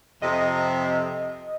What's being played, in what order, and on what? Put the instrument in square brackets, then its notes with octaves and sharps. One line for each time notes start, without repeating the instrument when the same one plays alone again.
[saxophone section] F2 C3 [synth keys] D#5